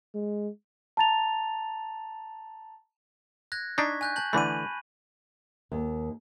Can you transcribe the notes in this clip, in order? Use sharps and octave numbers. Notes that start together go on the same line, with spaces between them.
G#3
A5 A#5 A6 F7
F#6 G#6 A#6
D4 D#4 C#6 G#6 B6
G#5 F#6 G6
A5 G6 F#7
D3 E3 A3 B5 D#7
D#2